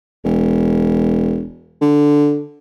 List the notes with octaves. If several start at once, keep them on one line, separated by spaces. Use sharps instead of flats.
E1
D3